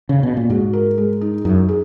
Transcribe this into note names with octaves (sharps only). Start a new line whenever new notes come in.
C#3
B2
A#2
G#2 F#4
A#4
G#3
D#4
F#2 D#4
G#4